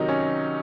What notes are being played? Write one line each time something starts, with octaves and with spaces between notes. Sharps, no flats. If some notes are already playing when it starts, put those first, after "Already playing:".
Already playing: C3 D#3 F#3 D#4
C#4